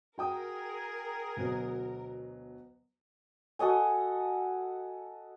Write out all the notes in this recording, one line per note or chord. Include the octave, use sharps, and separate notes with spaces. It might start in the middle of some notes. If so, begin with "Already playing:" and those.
F#4 G#4 A#4 G5 D#6
D2 B2 F#3
F#4 A4 D#5 G#5